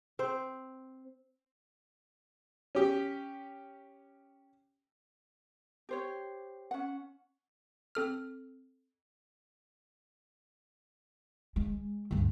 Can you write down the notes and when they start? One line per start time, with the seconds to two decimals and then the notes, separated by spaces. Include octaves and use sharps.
0.19 C4 C5
2.75 C#4 G4
5.89 G4 C5 C#5
6.71 C#4 F#5
7.95 C4 A4 F6
11.56 G#3
12.11 D2 G2